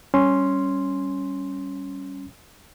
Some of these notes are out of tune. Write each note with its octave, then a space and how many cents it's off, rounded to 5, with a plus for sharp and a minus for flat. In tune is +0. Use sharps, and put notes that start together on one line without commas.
G3 -10 C#4 +0 C6 +0